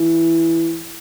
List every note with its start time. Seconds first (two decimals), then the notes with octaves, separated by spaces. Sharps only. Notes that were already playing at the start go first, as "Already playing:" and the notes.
Already playing: E3